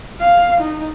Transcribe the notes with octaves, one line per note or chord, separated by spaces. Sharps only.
F5
D#4